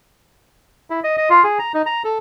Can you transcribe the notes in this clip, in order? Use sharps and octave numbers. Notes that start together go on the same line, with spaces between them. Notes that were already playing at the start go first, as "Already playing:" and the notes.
E4
D#5
D#5
F4
G#4
A#5
D#4
A#5
A4